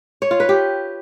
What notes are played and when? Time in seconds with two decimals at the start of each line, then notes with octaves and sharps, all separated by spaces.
0.22 C#5
0.31 F4
0.40 B4
0.49 G4